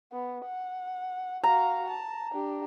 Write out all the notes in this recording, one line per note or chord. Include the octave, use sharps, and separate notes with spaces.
B3
F#5
F#4 F5 A#5
A5
D4 G4